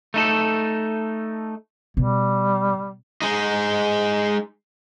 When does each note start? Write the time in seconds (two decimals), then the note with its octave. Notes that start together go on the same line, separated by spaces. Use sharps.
0.14 A3 D#4 A4
1.97 B2 G3
3.22 G#3 D#4